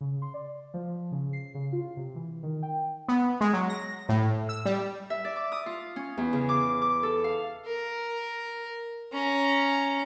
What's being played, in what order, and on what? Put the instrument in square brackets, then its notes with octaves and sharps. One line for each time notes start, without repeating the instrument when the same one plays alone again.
[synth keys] C#3
C6
D5
F3
C#3
C7
C#3
F4
C3
E3
D#3
G5
[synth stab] B3
G#3
F#3
A#6
A2
E6
G3
[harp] E5
D5
D6
D#6
F4
C#4
E2
C#3
D6
D6
A4
F5
[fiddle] A#4
C#4 A#5